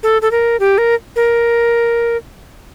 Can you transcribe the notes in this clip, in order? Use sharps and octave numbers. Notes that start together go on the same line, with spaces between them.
A4
A4
A#4
G4
A#4
A#4